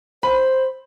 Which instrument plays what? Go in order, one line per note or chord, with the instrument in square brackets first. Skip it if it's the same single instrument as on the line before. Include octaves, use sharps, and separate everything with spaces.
[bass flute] C5 [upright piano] B5